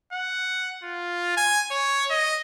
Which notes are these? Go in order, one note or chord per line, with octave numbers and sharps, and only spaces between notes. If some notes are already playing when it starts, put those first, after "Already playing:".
F#5
F4
G#5
C#5
D#5